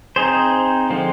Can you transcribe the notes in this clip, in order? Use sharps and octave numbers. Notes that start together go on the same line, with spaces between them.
C4 D#4 G#4 C5
D3 F3 G#3 C4 F4